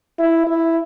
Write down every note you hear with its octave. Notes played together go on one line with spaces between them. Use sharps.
E4
E4